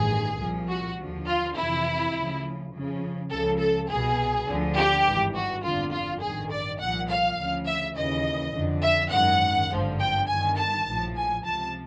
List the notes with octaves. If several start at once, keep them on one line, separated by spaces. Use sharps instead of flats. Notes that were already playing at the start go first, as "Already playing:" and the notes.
Already playing: A1 G2 D#3 G#4
C2 A#2 F3
F#4
D#2 D3 F3
F4
F2 C3 E3 E4
D2 C#3 F3
F2 C#3 F3
C#2 C#3 F3 A4
A4
C2 B2 G#4
D2 D3 F3
G4
G#1 G2 E3
F#4
G1 F2 D3 F4
F4
A1 G2 D#3 G#4
D5
C2 A#2 F3 F#5
F5
D2 C#3 F3
E5
D#2 C#3 E3 D#5
F2 D3 F3
E5
G#1 F#2 D#3 F#5
G#1 G2 D3 F3
G5
G1 G2 D#3 G#5
A5
A#1 A2 F3
G#5
C#2 C3 F3 A5